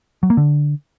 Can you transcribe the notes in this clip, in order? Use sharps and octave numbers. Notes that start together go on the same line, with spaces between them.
F#3
A#3
D3